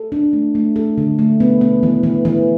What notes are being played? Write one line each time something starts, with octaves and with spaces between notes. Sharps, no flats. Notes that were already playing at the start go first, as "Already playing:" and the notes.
Already playing: A4
D4
A3
A3
A4
D3
A3
B3
B3
E3
E3
E3